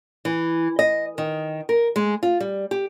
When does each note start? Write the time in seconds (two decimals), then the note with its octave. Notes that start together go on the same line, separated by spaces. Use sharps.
0.25 E3
0.79 D#5
1.18 D#3
1.69 A#4
1.96 G#3
2.23 F4
2.40 G3
2.71 G4